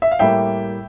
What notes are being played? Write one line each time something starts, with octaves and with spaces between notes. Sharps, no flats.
E5
F5
A2 G3 A#3 E5 G5